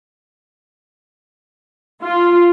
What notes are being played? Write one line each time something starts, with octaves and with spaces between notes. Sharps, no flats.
F4